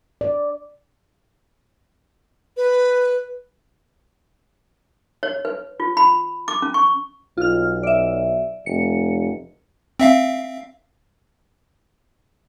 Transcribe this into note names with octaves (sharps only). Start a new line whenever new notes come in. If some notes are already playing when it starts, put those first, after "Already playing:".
D5
B4
C#5
B4
F4
B5
D6
C#4
C#6
B1 F4 F6
D5 E5
F1 C#7
C4 E5 F5